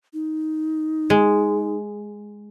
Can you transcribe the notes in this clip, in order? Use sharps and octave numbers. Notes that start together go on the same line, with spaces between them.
D#4
G#3